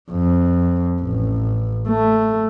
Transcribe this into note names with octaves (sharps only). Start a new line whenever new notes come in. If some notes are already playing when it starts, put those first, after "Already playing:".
F2
A1
A3